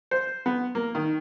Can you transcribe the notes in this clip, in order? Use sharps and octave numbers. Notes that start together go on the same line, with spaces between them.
C5
B3
A#3
D#3